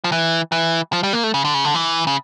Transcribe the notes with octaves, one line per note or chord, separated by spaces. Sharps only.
F3
E3
E3
F3
G3
A#3
A3
C#3
D3
C#3
D3
E3
C#3